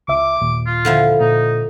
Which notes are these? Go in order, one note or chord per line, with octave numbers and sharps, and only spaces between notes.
C#2 E5 D6
D#2 A#2
F4
D3 F3 E4
A#2 D#4